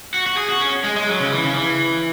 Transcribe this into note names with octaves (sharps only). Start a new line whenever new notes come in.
F#4
F#4
G#4
F#4
C#4
G#3
G#3
F#3
C#3
E3
C#3
E3